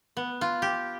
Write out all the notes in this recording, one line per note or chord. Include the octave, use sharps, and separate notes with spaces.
B3
F4
G4